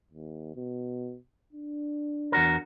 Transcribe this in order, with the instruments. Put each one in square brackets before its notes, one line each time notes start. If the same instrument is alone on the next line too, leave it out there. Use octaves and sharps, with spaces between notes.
[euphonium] D#2
B2
D4
[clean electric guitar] E2 F#4 A#4